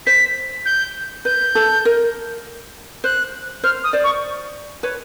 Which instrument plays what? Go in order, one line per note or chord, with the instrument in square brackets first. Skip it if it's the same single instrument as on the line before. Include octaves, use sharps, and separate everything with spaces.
[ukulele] C5 [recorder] B6
[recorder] G6
[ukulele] B4 [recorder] G6
[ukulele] A4
A#4
[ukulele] C5 [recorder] F#6
[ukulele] C5 [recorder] F6
[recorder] D#6
[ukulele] C5 D5
[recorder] C#6
[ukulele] B4 C#5